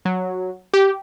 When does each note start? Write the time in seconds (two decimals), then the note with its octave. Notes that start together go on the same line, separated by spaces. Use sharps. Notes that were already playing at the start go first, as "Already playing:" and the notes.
0.05 F#3
0.73 G4